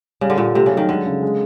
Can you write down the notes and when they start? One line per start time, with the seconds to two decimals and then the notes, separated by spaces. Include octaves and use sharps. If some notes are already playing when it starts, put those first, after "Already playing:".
0.21 C#3 G3
0.30 D3
0.38 A#2 G3
0.55 C3 A3
0.66 C#3
0.72 F#3
0.77 D#3
0.89 D3 G#3
1.05 C#3
1.23 G#3